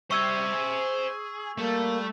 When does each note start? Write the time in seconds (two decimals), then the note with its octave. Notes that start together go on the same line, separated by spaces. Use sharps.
0.11 G3 C5 E5 C#6 E6 G#6
0.53 G#4
1.58 G3 A3 A#3